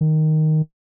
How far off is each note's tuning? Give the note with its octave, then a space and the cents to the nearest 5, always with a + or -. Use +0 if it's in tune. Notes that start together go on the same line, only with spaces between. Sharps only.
D#3 +0